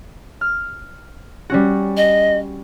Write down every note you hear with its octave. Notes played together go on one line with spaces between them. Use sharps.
F6
G3 C#4 F#4
D#5